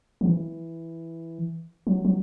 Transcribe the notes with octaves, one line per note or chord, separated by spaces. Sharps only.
F3
E3
F#3
F#3